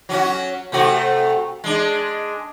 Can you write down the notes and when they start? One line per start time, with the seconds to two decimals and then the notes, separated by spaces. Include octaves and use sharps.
0.09 F#3 C#4 F#4
0.72 C3 A3 F#4
1.64 G#3 D4